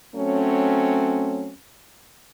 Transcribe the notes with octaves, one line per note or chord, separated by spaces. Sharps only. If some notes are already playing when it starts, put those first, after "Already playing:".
F#3 A3 C4 C#4